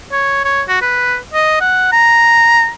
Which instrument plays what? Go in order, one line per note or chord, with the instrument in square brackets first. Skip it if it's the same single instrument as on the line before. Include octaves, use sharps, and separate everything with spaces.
[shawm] C#5
C#5
F#4
B4
D#5
F#5
A#5